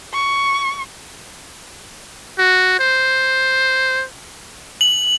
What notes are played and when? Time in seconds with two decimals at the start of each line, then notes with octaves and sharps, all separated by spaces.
0.13 C#6
2.38 F#4
2.79 C5
4.81 F#7